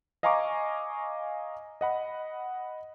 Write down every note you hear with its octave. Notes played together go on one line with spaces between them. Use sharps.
D#5 F5 G#5 A#5 C#6 D6
D#5 F#5 B5